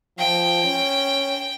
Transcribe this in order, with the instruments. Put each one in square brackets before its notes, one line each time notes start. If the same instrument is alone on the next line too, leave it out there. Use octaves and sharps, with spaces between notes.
[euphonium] F3 [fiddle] G5
[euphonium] C#4